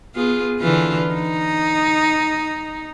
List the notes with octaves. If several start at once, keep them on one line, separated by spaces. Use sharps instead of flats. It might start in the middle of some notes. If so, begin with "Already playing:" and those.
B3 F4 G#4
D3 E3 F4
D#4